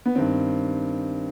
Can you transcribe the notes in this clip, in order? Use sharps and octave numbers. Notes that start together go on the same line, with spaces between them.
B3
G2 D#3 C4